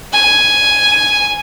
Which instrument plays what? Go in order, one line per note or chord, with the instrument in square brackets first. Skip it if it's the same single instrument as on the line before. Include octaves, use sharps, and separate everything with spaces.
[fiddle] G#5